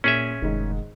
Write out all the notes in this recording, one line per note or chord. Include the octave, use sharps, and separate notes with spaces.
A#2 C#4 G#4 E5
F1 G#2 D#3